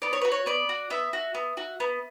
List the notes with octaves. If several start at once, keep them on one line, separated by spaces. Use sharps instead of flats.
B3 D5
C#5
F#4 B4
C#5
B3 D5
F#4
B3 E5
F#4
B3
F#4
B3